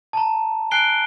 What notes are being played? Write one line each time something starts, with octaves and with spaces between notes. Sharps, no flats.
A5 A#5
G#5 F#6 C7 D7 G7